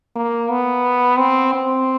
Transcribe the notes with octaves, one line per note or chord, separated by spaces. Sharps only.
A#3
B3
C4
C4